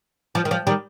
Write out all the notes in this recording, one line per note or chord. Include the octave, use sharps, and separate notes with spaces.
F3
D#3
F3
D#3 G3